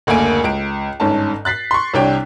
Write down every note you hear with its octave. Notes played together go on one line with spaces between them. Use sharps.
F#1 D2 A3 A#3 G#5 D7
C#2 D7
G1 G#2 C#4 A5
F#6 A6 B6 C7
C6 C#6
C2 C3 D4 C#5 G5